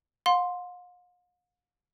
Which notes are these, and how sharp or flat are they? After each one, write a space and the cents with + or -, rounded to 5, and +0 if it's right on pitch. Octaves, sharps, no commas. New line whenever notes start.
F5 +45 C6 +0